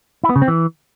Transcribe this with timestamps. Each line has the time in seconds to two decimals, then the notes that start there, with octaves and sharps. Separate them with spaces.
0.24 E4
0.30 B3
0.36 C#3
0.42 C4
0.48 E3